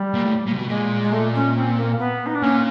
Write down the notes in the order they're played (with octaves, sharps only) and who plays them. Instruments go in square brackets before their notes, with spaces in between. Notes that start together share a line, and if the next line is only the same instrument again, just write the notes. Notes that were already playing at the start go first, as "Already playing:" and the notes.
Already playing: [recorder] G3
[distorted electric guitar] A#2
A2
A#2
C3
B2
[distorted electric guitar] A#2 [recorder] G#3
[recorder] G#3
A3
C#4
C4
A#3
B3
D#4
D4
[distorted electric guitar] A#2 [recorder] C#4